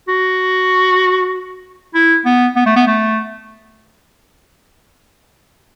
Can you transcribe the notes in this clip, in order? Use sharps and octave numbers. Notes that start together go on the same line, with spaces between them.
F#4
E4
B3
B3
A3
B3
A3